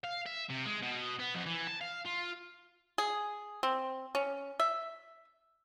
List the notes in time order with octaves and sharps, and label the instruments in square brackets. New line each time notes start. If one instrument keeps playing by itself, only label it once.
[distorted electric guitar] F5
E5
C3
G#3
B2
B3
F2
E3
A5
F5
F4
[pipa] G#4
C4
C#4
E5